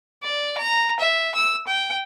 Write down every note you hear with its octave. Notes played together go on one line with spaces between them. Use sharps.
D5
A#5
E5
E6
G5